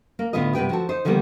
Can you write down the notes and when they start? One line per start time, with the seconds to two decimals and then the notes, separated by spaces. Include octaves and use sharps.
0.19 A#3
0.33 A2 D3 B3 F4 B4 D#5
0.55 G2 C3 B3 F4 B4 G5
0.70 F3 F#4 A4
0.89 D#4 C5
1.05 D3 D#3 F3 G3 A#3 B3